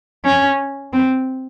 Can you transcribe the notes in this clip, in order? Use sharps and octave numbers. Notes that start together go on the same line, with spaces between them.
C#4
C4